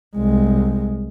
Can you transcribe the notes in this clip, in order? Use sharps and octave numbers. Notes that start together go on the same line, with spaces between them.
C2 G#3